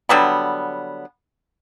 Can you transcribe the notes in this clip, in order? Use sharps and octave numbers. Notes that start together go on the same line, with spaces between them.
D3 F#3 G3 B3